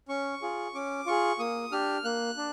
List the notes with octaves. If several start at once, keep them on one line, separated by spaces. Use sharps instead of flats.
C#4 C#6
F4 G#4
C#4 D6
F4 G#4 C#6
A#3 D#6
D4 G4 F6
A#3 F#6
D4